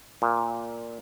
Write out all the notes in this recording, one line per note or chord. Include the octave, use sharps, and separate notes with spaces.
A#2